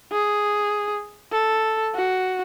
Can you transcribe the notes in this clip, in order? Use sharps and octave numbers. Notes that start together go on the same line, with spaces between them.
G#4
A4
F#4